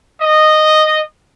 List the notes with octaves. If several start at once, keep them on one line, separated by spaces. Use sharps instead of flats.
D#5